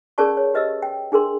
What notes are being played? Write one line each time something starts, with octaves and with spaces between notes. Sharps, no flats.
C#4 G#4 A#4 D5 A5 C#6
C#5
G4 B4 D#5 E5 E6
G5
D4 G#4 A#4 C6